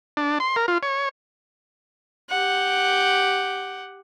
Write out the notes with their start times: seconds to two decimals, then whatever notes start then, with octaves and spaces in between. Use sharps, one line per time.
0.17 D4
0.40 C6
0.56 A#4
0.68 F4
0.83 C#5
2.30 G4 F#5